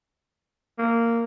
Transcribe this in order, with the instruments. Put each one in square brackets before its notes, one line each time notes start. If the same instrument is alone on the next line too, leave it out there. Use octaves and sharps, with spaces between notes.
[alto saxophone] A#3